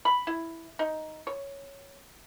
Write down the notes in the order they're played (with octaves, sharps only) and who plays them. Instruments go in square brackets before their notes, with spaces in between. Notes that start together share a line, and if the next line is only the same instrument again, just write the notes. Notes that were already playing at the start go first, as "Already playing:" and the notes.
[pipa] B5
E4
D#4
C#5